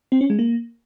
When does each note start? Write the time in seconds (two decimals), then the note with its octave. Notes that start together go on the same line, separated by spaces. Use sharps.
0.12 C4
0.21 C#4
0.30 G#3
0.39 A#3